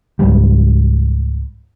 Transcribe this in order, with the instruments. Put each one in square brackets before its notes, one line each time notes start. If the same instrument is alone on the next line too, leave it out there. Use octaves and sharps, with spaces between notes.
[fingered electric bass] C#2 G#2 F#3 G3